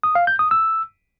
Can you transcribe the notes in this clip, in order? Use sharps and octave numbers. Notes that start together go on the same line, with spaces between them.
D#6
F5
G6
D#6
E6